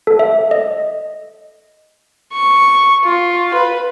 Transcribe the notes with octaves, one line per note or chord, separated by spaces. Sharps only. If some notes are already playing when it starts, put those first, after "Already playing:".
A4
E5
D#5
C#6
F4
B4